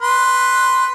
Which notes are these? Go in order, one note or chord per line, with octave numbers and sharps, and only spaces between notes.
B4 C6